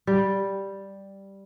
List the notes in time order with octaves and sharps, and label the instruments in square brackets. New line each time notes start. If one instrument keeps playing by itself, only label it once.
[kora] G3